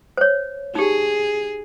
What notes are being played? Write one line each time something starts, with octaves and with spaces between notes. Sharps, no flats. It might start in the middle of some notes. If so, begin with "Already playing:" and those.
C5 C#5
D#4 G4 G#4